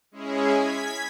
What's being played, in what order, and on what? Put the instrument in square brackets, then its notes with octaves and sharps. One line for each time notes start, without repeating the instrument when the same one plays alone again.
[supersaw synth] G#3 C#4 E4 G#4
G#6 B6